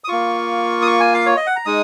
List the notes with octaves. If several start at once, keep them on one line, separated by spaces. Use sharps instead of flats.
D#6
A#3 F4 C#6
D#6
C#6
G#5
F5
C#5
D#5
F#5
A#5
G#3 D#4 D#6